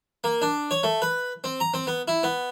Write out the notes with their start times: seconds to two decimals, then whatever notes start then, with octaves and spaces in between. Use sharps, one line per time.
0.24 A#3
0.42 D4
0.71 C#5
0.83 A3
1.02 B4
1.44 C4
1.60 A#5
1.74 C4
1.87 B3
2.08 E4
2.23 B3